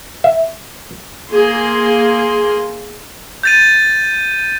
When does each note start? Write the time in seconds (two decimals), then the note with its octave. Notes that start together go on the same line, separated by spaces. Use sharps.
0.24 E5
1.30 A#3 G#4 C6
3.43 G6 A6 D#7